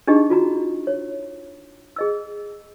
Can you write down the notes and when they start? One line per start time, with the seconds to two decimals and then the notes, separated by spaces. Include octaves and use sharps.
0.07 D4 D#4 G4 G#4 D#5
0.30 F4 F#4 A#5
0.87 C#5
1.96 G#4 D#5 E6